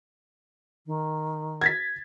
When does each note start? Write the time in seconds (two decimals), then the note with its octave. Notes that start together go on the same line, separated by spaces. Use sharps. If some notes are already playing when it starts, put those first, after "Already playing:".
0.86 D#3
1.61 G#6 A6 B6